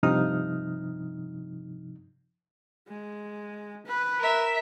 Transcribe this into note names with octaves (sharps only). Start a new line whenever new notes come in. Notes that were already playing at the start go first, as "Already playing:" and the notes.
G2 C3 F3 D#4 D#6 F6
G#3
B4
A#4 E5